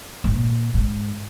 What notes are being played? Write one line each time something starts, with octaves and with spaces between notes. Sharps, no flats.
G#2
A#2
G#2